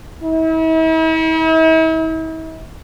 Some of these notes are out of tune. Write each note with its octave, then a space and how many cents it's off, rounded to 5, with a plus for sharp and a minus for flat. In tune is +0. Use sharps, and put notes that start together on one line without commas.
E4 -45